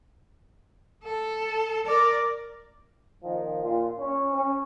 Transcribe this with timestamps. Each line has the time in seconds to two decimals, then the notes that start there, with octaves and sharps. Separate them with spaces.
1.04 A4
1.86 A#4 D5
3.22 A#2 D#3 F3
3.62 A#2 F4
3.96 C#4
4.33 C#4